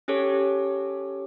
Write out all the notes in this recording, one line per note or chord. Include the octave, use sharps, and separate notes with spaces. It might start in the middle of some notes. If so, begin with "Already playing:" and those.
C#4 G4 A4 C#5